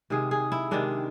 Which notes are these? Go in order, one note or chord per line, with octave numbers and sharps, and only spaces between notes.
C3 D#3 G#3 G#4
G#4
E4
C3 D#3 G#3 D4